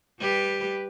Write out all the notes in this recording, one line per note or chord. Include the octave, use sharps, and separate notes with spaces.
G3 G4 B4